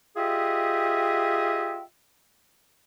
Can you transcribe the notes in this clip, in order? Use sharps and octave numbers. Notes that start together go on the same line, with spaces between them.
F4 G4 G#4 D#5 E5 G5